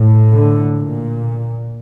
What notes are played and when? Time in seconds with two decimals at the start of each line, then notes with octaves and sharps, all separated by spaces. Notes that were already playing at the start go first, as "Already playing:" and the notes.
Already playing: A2
0.33 D3
0.79 A#2